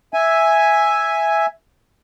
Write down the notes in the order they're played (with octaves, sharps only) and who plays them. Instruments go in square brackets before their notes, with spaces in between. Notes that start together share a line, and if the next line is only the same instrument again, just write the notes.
[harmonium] E5 G#5